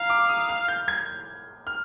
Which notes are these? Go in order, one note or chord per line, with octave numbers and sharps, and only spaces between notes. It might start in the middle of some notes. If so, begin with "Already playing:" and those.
Already playing: F5 A#5
D6
D#6
F6
G6
G#6
F6